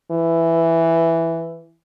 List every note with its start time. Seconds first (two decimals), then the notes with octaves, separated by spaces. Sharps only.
0.11 E3